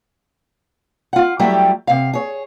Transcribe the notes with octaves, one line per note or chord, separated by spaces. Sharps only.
F4 F#5
F#3 G3 A3 E4 G4
C3 F5
G#4 C#5